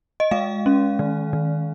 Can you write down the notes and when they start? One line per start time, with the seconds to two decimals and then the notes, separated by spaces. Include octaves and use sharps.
0.20 D#5
0.31 G#3 F5
0.66 C#4
0.99 D#3
1.33 D#3